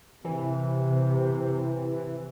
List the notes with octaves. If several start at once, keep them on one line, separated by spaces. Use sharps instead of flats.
C3 E3